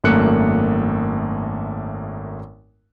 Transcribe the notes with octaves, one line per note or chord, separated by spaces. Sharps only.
G#1 F#2 A3 A#3 F#6 C#7